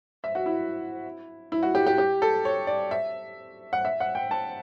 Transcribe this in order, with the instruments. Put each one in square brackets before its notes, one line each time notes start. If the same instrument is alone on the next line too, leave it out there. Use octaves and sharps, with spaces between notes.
[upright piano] E5
F#4
E4
E4
F#4
G4
G4
G4
A4
C#5
D5
E5
F#5
E5
F#5
G5
A5